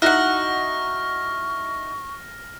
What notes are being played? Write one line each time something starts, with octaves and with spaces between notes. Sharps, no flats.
D#4 E4 F#4 F#5 C#6 F6 A#6